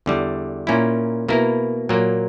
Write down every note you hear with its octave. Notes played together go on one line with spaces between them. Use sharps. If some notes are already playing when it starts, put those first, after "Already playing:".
E2 D3 G3
A#2 A#3 C#4 E4
B2 A#3 E4 A#4
A#2 F#3 A#3